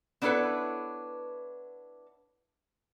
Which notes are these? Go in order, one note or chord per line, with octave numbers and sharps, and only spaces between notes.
B3 D4 E4 A4 B4 C#5